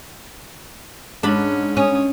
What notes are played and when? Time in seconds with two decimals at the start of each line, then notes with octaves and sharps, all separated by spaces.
1.23 G#2 C#4 D4 B5
1.77 C#4 C#5 D#6